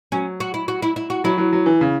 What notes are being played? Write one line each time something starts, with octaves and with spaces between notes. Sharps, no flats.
F#3 C#4
F#4
E4
F#4
E4
E4
F#4
F#3 E4
F#3
F#3
E3
C#3